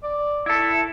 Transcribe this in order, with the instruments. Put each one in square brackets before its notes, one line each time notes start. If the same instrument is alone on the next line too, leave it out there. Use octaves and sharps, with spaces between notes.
[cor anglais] D5
[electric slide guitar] E4 A4 [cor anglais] E5